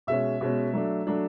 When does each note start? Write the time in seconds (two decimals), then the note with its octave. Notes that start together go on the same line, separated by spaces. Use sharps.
0.07 B2 G#3 C#4 E5
0.41 B2 G#3 C#4
0.73 F#3 A3 D4
1.07 F#3 A3 D4